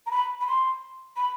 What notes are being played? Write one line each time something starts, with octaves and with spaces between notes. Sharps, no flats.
A#5
B5
B5
C6
B5